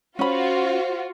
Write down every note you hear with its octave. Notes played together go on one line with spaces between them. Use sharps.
C#4 F4 F#4 C5 B5